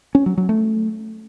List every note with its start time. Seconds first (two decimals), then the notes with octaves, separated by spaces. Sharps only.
0.15 C#4
0.26 F#3
0.37 F#3
0.49 A3